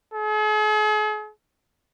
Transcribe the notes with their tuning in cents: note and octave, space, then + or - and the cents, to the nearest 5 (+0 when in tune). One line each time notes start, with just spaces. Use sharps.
G#4 +45